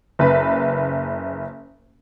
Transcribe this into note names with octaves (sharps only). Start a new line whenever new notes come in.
F#1 B4